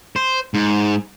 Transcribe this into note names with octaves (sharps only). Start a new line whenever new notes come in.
C5
G#2